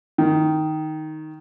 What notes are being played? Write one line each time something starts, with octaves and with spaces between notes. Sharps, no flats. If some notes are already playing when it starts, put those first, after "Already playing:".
D#3